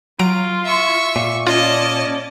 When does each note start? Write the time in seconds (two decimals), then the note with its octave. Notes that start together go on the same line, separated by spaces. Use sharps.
0.19 F#3 F4 A#5 D7
0.65 E5 C#6
1.16 A#2
1.47 C#4 F4 D5 D#5 A5